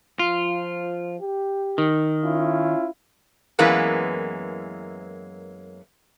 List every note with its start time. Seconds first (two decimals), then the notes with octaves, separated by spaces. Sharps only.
0.19 F3 F4
1.21 G4
1.78 D#3
2.23 C#4 E4 F4
3.59 F#2 E3 G#3 A#3 B3